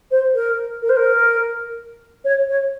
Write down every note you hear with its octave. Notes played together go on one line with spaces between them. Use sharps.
C5
A#4
A#4
C5
A#4
C#5
C#5